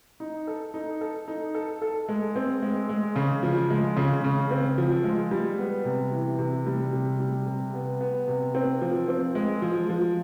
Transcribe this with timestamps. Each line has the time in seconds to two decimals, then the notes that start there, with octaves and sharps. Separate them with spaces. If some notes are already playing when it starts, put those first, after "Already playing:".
0.20 D#4
0.47 A4
0.74 D#4
1.01 A4
1.28 D#4
1.55 A4
1.82 A4
2.09 G#3
2.36 C4
2.62 G#3
2.89 G#3
3.16 C#3
3.43 F3
3.70 G#3
3.97 C#3
4.24 C#3
4.51 C4
4.78 F3
5.04 G#3
5.31 G3
5.58 B3
5.85 C3
6.12 E3
6.39 C3
6.67 G3
6.93 C3
7.20 G3
7.47 C3
7.74 B3
8.01 B3
8.27 C3
8.55 C4
8.81 F3
9.08 C4
9.35 G#3
9.62 F3
9.89 F3